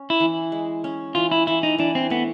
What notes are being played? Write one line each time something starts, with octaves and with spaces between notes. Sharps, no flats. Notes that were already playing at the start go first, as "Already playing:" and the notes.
Already playing: C#4
E4
E3
G#3
C#4
E3 F4
E4
E3 E4
D#4
E3 D4
C4
A3 B3